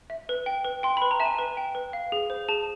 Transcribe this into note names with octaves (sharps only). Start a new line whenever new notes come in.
E5
B4
G5
B4
G5 C6
B4 B5
A#5
E5 A5
G#5
B4
G5
B4
F5
G#4
C5
G#4 A5